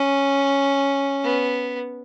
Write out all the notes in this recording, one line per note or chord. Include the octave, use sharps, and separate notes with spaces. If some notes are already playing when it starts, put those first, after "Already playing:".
Already playing: C#4
B3